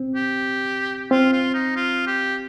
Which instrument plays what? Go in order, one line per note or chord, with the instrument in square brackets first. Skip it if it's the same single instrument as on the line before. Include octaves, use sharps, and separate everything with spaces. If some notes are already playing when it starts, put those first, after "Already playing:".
Already playing: [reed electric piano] C4
[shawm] G4
[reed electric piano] C4 [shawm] F4
[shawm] F4
D#4
F4
G4